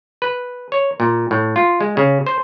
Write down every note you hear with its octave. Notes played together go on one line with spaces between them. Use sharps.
B4
C#5
A#2
A2
F4
G#3
C#3
C5